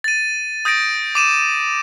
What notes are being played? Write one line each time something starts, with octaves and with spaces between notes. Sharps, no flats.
A6 D#7
D#6 G6 A6 A#6 D7
D6 D#7 E7